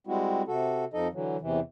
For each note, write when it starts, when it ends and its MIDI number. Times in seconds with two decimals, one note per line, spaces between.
0.07 0.42 55
0.07 0.42 56
0.07 0.42 60
0.07 0.42 64
0.07 0.42 66
0.47 0.85 48
0.47 0.85 66
0.47 0.85 69
0.94 1.08 41
0.94 1.08 53
0.94 1.08 63
0.94 1.08 69
0.94 1.08 75
1.13 1.37 50
1.13 1.37 52
1.13 1.37 54
1.41 1.60 40
1.41 1.60 48
1.41 1.60 52